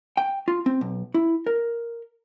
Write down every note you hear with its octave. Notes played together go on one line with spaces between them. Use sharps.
G5
F4
C4
B1
E4
A#4